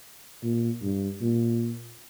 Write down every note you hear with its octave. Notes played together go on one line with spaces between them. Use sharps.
A#2
G2
A#2